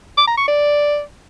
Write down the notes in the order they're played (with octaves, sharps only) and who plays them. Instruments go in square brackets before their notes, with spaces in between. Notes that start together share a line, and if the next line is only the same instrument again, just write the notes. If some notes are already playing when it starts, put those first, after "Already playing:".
[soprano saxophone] D6
A#5
C#6
D5